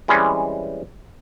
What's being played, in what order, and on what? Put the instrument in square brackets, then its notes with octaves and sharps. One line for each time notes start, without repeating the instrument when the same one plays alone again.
[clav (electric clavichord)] E3 G3 G#3 C4 C#4